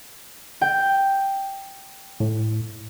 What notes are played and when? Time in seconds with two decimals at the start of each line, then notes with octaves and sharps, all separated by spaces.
0.61 G5
2.20 A2